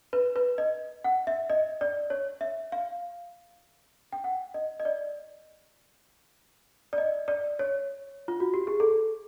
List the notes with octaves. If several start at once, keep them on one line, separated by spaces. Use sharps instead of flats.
B4
B4
D#5
F#5
E5
D#5
D5
C#5
E5
F5
G5
F#5
D#5
D#5
D5
D5
D#5
D5
C#5
F4
F#4
G4
G#4
A4